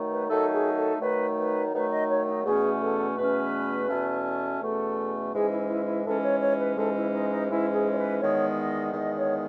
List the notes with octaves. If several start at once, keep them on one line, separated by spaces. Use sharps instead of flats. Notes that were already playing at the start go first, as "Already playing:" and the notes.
Already playing: D#3 F#3 A3 D#4
B4
D#3 F#3 A3 D#4 A4
G#4
A4
D#3 F#3 A3 D#4 B4
B4
D#3 F#3 A3 D#4 B4
D#5
C#5
D#4
E2 B2 A3 C#4 G#4
A4
E2 B2 A3 C#4 B4
E2 B2 A3 C#4
E2 B2 A3 C#4 A4
G#2 E3 G#3 C#4 G#4
E4
E4
E4
G#2 E3 G#3 C#4 A4
C#5
C#5
B4
G#2 E3 G#3 C#4 A4
E4
D#4
D#4
G#2 E3 G#3 C#4 E4
G#4
C#5
B4
E2 D#3 G#3 B3 C#5
D#5
E2 D#3 G#3 B3 D#5
C#5